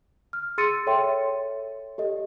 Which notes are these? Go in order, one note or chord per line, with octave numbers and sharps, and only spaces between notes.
F6
G#4 C6 E6 A6 C#7 D#7
A4 C#5 E5 G5 C6
G4 A4 D#5